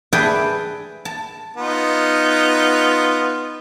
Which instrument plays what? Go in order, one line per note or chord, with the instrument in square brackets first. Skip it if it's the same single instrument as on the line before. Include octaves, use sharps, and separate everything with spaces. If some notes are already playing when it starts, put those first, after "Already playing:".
[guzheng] G#4 B4 D5 E5 G5 A5
A5
[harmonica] B3 D#4 F4